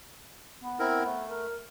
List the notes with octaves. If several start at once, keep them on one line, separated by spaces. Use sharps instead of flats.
B3
C4 E4 A#4
A3
A#4